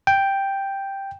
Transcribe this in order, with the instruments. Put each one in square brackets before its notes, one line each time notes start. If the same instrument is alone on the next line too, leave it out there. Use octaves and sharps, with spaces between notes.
[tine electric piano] G5